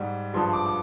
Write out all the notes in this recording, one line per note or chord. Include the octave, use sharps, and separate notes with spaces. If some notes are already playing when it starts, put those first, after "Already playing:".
Already playing: G#2 G3
G2 F3 G#3 C6
D6
D6